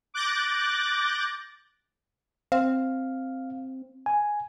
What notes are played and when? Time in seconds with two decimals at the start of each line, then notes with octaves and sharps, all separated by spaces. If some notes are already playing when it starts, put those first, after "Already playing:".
0.14 D6 F#6 G6 A6 A#6
2.52 C4 F5
4.06 G#5